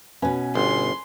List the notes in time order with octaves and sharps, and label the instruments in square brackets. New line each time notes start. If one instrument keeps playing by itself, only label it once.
[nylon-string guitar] B2 C#4 [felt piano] B4 G#5
[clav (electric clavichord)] G1 [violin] C6